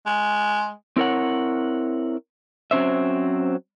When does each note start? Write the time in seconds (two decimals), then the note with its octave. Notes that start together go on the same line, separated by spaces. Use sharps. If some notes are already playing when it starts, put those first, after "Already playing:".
0.06 G#3
0.97 C4 E4 A#4 C#5 F#5
2.71 F#3 C4 C#4 C5 E5